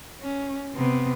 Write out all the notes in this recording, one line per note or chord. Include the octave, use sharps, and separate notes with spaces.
C#4
C3 B3